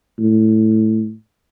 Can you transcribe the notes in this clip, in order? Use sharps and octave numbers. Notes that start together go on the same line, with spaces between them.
A2